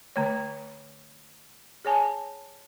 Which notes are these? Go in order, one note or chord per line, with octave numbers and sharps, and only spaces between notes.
D3 A3 C#5
G#4 C#5 G#5 A5